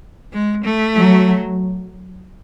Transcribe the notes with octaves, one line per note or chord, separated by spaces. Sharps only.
G#3
A3
F#3